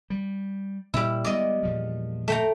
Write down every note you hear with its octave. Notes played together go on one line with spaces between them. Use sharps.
G3
A#2 G3 E4
G3 G#3 B3 D5 D#5
E2 A#2 F3
A3 G5 A#5